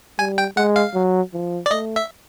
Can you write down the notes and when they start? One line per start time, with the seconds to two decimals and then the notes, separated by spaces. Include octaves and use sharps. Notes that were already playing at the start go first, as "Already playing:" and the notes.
0.19 G3 G#5
0.38 G5
0.56 G#3 F#5
0.76 F5
0.94 F#3
1.33 F3
1.66 D5
1.71 A3 D#5
1.96 E5